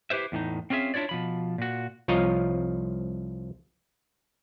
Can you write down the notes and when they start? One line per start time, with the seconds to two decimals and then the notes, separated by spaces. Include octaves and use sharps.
0.10 E4 G4 B4 C5 E5
0.32 E2 A2 D4 D#4
0.70 C4 C#4 F4 G#4 E5
0.94 D4 E4 F4 C#5 D5
1.09 B2 F3 B5
1.58 A#2 F#4
2.08 C2 F3 F4 C#5 D#5 A#5